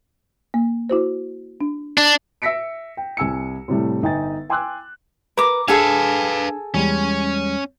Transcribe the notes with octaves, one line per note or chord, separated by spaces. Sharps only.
A#3
E4 F#4 C5
D4
D4 D5
E5 E6 A#6 B6 C#7 D7
G5
C2 G#5 E6 C#7
A2 C3 G3 A3
G1 D#4 G5 G#5 A6
G5 G#5 C6 D6 E6 F#6
A#4 B4 D6
D4 G#4 A4 B4 F5 G#5
E2 G3 G#3 C#4